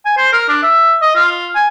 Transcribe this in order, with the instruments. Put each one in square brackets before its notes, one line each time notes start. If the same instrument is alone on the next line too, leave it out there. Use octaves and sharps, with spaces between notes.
[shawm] G#5
C5
A#4
D4
E5
D#5
F4
G#5